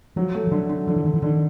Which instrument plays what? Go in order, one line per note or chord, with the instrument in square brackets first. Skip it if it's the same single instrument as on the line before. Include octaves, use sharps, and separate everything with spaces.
[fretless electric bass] F3 [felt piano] F#3
[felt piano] A3
[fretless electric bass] F3
[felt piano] D3 [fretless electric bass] F#3
[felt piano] D3
[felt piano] D3 [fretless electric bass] F3
[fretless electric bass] E3
[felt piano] D3 [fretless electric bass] D#3
[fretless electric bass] E3
[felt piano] D3 [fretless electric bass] D#3